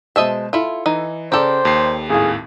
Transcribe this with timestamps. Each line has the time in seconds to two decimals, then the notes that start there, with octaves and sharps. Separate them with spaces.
0.16 B2 G#3 C5 D#5 E5 A5
0.53 E4 F4 A4
0.86 E3 D#4
1.32 C#3 G4 A4 C5 D5 A#5
1.65 D#2 C7
2.10 G#1 A2 G#4 F5